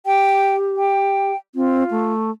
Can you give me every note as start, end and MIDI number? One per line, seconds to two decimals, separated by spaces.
0.06 1.32 67
0.06 0.55 79
0.77 1.36 79
1.55 1.84 60
1.55 2.12 65
1.91 2.31 57